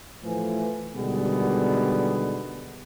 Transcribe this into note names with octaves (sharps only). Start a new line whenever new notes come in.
A2 E3 F3 A3 B4 G#5
B2 D3 D#3 G3 G#3 B3